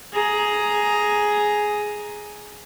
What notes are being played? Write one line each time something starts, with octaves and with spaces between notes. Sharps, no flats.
G#4 A#5